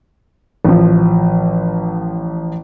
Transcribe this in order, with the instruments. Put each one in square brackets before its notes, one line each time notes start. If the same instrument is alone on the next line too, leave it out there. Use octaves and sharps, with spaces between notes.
[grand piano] A1 F3